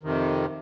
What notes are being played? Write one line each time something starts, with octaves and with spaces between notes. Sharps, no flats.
F2 C3 D#3